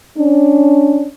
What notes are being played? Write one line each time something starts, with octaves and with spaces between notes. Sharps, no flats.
C#4 D4